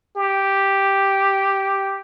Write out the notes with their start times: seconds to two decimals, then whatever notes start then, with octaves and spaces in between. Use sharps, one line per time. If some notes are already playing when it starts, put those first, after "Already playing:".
0.16 G4